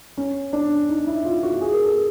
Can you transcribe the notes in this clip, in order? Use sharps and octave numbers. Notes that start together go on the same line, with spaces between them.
C#4
D4
D#4
E4
F4
F#4
G#4
A#4
A4